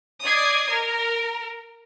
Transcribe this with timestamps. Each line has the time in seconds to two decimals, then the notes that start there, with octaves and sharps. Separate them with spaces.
0.23 D5 D#5 D#6 G#6 C7
0.71 A#4